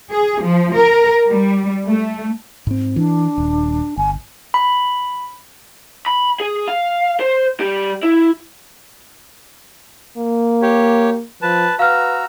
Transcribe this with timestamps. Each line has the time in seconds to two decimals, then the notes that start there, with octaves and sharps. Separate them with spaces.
0.10 G#4
0.42 F3
0.74 A#4
1.28 G3
1.86 A3
2.67 G#2 C4
2.96 E3 D4
3.38 D#1
3.97 G1 G#5
4.54 B5
6.06 B5
6.40 G#4
6.68 F5
7.20 C5
7.60 G3 G4
8.03 E4
10.17 A#3
10.62 G4 C#5
11.42 F3 B4 A5
11.79 F#4 B4 F5 A#5 E6 F6